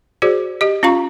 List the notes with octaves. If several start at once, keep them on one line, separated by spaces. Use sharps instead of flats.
F#4 G#4 C5 D5
G4 D#5
C#4 F4 F5 A#5 C#6